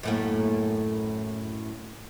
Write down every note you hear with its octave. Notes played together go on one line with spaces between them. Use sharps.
F#2 A2 A#3